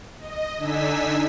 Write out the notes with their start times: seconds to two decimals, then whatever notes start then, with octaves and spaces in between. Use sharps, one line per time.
0.19 D#5
0.58 D3 D4 D#4 G#5 E6 B6